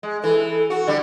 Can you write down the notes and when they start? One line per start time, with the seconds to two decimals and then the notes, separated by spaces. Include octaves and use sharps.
0.03 G#3
0.24 E3 A4
0.70 F#4
0.87 D3 G3